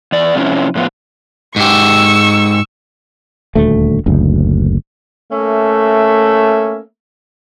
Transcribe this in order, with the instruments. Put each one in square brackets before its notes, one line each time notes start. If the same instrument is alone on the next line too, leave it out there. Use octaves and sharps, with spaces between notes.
[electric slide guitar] E2 D5
C3 F3 A3 A#3 C#4 E4
A2 F3 B3 F4
[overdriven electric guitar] G#2 G4 [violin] C#6 E6
[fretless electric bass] D#1 D2 A3
F#1 D2
[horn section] A3 A#3 C#4 E5